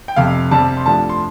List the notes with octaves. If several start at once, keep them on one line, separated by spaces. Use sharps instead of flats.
G5
F1 F2 C3 F5
C2 C3 G3 C4 A5
C6
G2 F3 A3 D4 A5
C6